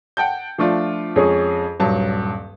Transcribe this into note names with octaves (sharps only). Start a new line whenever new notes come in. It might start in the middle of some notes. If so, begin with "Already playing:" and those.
F#5 G5 A5 G6
F3 A3 D4 F4
F2 G#3 C#4 G#4
D#1 G2 F#3 A5